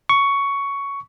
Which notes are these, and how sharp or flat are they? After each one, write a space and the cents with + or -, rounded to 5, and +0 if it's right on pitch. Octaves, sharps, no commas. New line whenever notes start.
C#6 +10